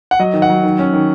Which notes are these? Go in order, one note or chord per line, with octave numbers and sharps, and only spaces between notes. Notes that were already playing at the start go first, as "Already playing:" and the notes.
F#5
F#3 D#5
D#3
F#5
F#3
D#3
C#4
D#3